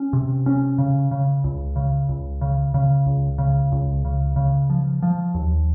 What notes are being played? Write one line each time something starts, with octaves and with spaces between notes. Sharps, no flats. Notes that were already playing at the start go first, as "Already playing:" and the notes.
Already playing: C#4
C3
C#4
C#3
C#3
C#2
C#3
C#2
C#3
C#3
C#2
C#3
C#2
C#3
C#3
F3
F3
D#2